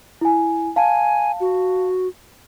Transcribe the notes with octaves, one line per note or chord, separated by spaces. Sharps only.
E4 G#5
F5 G#5 A5
F#4